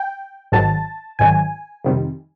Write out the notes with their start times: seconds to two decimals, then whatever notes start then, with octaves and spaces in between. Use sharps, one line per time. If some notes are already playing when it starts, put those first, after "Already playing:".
Already playing: G5
0.52 G#1 G#2 D#3 F#3 A5
1.19 G#1 G#2 D#3 F#3 G#5
1.84 F2 C3 D#3 G3